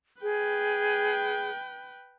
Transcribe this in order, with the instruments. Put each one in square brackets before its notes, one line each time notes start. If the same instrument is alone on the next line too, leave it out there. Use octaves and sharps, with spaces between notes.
[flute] G#4 [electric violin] B4 G5